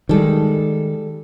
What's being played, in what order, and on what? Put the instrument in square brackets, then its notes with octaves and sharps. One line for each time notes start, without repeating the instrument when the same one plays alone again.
[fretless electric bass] D#3 G#3 [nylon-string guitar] G3 A4